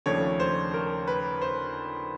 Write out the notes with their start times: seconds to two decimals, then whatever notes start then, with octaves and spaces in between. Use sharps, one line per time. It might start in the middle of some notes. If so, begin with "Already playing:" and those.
0.06 D#2 C#3 F3 A3 D4 C#5
0.40 C5
0.74 A#4
1.07 B4
1.42 C5